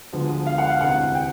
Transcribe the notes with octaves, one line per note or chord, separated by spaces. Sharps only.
D2 D3 F3 G#3 B3
F5
F#5
F5
E1 D2 C3 E3 F#5
G5